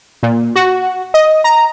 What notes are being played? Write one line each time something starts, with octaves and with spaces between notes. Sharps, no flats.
A#2
F#4
D#5
A#5